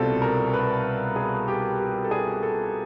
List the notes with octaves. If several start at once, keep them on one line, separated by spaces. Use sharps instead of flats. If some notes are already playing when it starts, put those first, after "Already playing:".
Already playing: C2 B2 G3 C4 F4 A4
A#4
B4
G#4
G4
G4
A4
G#4
A4